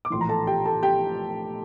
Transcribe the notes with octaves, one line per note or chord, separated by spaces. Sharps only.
D6
A#1 A2 E3 C6
A#5
A4 A5
G4 G5
A4 A5
G4 G5